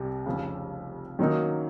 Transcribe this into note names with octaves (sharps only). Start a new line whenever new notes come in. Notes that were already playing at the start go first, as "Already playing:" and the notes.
Already playing: C2 C3
F1 F2 C#3
F#2 D#3 F#3 A#3 D#4